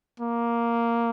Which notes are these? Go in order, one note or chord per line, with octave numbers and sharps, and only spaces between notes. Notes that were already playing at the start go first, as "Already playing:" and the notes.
A#3